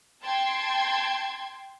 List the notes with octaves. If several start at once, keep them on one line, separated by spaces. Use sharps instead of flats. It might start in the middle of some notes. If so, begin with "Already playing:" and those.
G5 A5 C6 G#6